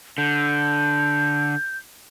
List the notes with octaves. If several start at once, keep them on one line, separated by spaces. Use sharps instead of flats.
D3 G6